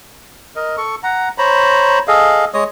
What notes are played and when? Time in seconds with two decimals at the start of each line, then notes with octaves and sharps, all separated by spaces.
0.56 A#4 D#5
0.77 A4 C#6
1.03 F#5 A#5
1.38 C5 C#5 A#5 B5
2.08 G#4 A4 D#5 F5
2.54 G#3 C#5 D#5 D#6